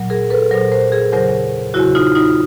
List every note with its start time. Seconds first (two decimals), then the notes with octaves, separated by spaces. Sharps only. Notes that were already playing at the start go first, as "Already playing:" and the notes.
Already playing: A#2 F#3
0.10 G#4 A#4
0.30 A4 B4
0.51 A#2 F#3 A#4 C5
0.72 A#4 C5
0.92 G#4 A#4
1.12 E2 C#3 F#3 A#4 C5
1.74 E2 C#3 F#3 E4 F#4
1.95 D#4 F4
2.15 D#4 F4